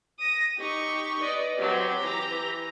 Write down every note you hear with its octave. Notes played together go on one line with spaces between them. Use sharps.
D#6 A#6
D#4 G4 C#6
B4 D5 D#5
F#3 C4 G4
E3 A#5